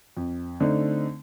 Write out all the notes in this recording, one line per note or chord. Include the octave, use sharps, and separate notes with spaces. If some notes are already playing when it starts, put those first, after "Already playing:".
F2
D3 A3 C4 D#4